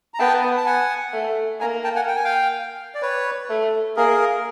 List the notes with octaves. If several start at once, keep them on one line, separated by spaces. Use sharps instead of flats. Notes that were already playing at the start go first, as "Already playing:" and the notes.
A#5
B3 G5 A5
A5
F#5 G#5
A3
A#3 G#5 A#5
G5 A5
F#5 G#5
G5
G#5
F5 G5
D5
B4 C#5
A3
A#3 G#4 A#4